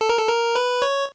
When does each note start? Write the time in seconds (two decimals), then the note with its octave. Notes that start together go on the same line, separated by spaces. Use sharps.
0.01 A4
0.09 A#4
0.18 A4
0.28 A#4
0.55 B4
0.82 C#5